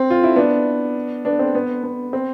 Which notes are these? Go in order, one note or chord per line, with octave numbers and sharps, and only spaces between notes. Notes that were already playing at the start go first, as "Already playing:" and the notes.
Already playing: C4
F4
E4
B3 D4
B3 D4
C4
B3
B3
C4